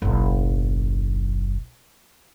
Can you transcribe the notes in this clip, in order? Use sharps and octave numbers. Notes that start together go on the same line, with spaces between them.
F#1 B1